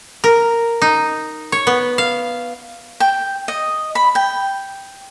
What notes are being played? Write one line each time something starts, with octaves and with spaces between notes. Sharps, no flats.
A#4
D#4
C#5
B3
F5
G5
D#5
B5
G5